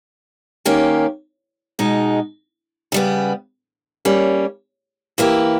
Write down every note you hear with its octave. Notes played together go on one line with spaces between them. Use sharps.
D#3 A#3 C#4 G4
B2 G#3 D#4
C#3 G3 B3
G3 A#3 C#4
E3 A#3 E4 G4